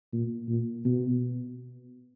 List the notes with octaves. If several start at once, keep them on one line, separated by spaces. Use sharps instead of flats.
A#2
A#2
B2